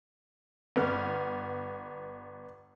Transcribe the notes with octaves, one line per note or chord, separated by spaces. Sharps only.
G1 B3 F6